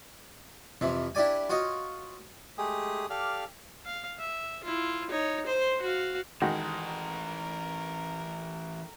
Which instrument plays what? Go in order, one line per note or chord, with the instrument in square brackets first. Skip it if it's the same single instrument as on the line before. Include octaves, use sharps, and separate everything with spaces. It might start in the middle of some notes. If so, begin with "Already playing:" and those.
[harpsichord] F2 C3 E3 F3
D4 E4 G4 D5 G#5
F4 F#4 C#5 D#5
[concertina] G#3 A3 G4 G#4 D#6
G4 A4 D5 F5 F6
[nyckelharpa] F5
E5
E4 F4
D#4 C#5
C5 C6
F#4 F5
[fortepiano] D#3 G#3 F#4 [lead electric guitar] E3 A4 [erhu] A#4